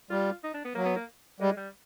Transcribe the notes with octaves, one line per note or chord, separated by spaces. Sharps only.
G3 F4
D#4
D4
B3
F#3 A#3
B3
A#3
G3 G#3
G3